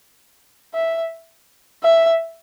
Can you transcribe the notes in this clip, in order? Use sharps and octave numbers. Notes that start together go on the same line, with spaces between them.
E5
E5